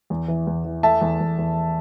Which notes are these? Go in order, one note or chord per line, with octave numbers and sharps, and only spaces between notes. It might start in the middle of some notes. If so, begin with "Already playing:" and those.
E2
E3
E2
E3
A3 E5 A5
E2
E2
E2